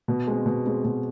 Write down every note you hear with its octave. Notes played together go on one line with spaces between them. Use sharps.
B2
G#3 C4
B2
G#3 C4
B2